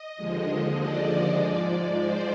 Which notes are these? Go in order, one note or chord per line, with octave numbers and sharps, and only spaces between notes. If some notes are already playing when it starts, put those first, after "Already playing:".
Already playing: D#5
D#2 D3 F3 G#3
D5
G#2 F3 G#3
C5